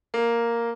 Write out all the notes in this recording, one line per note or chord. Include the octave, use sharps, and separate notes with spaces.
A#3